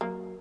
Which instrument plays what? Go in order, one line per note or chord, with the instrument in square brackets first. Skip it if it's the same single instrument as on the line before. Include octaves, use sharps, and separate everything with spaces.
[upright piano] F#3 [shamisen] A#3